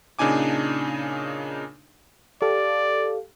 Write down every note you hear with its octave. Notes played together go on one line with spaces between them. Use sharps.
A#2 C#3 D4 D#4 G#5 D6
G4 A4 D5 F5